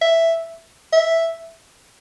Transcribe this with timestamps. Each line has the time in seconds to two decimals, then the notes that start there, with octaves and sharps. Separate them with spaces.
0.01 E5
0.93 E5